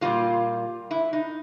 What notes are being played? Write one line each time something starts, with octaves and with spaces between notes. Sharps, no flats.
A#2 G3 A#3 F4
E4
D#4